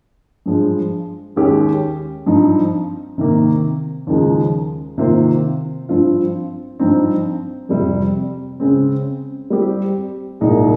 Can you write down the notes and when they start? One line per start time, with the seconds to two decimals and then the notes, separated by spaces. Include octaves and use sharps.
0.46 G2 F3 G#3
1.36 D#2 D#3 G#3 C#4 G4
2.26 G2 F3 C4 D#4
3.18 C3 D#3 A#3
4.07 D#2 C#3 F3 G#3 D#4
4.98 C3 D#3 A#3 F4 C5
5.89 G2 F3 C4 F4
6.79 G2 F3 C4 D#4
7.69 F2 C3 G3
8.60 C#3 G#3 C4
9.50 G3 C4 G4
10.40 C2 A#2 G#3 D#4